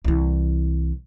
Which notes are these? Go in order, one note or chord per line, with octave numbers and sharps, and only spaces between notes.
C2 E3